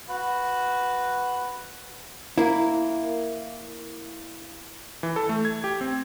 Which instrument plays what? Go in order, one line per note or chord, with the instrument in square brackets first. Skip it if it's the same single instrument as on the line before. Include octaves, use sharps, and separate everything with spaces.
[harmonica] F#4 B4
[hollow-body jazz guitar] A#3 E4
[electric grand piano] E3
A4
A3
G#6
G4
C4